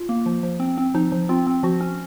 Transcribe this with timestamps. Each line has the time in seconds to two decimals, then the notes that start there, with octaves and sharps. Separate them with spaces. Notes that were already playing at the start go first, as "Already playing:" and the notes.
Already playing: F4
0.09 A#3
0.26 F3
0.43 F3
0.60 C4
0.78 C4
0.94 F3 D#4
1.12 F3
1.29 C4 F4
1.47 C4
1.63 F3 F#4
1.81 C#4